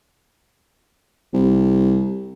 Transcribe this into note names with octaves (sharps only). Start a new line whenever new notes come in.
C2